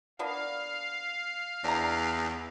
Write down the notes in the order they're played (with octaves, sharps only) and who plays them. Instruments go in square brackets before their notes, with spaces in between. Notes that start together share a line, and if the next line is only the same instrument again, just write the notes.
[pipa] A#3 B3 D4 [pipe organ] F5
[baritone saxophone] E2 [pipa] D4 A#5